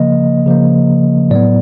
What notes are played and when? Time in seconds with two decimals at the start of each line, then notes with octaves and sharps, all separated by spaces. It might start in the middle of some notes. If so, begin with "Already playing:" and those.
Already playing: C#3 F3 A#3 D#5
0.46 C#3 F3 A#3
1.30 A2 F#3 B3 D5